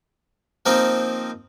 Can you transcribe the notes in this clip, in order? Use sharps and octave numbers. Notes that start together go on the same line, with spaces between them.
F3 A#3 C4 D#4